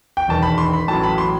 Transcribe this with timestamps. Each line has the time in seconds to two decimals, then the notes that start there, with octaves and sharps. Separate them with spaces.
0.17 G5
0.28 E1 E2 D#3 A5
0.43 B5
0.58 C6
0.73 B5
0.88 A1 A2 F#3 A5
1.03 B5
1.18 C6